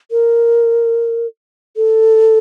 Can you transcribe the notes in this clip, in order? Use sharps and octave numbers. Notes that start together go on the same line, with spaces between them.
A#4
A4